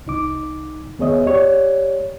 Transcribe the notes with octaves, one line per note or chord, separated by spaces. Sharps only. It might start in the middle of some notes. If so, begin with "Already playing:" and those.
C2 D#4 D6
D#2 B3 G#4 C#5 D#5 E5
G4 C#5 D5